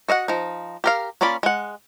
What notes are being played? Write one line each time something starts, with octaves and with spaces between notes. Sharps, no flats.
F#4 D#5 F5 F#5
F3 D#4
G4 A#4 F5
A#3 C#4 F4 D5 B5
G#3 F#5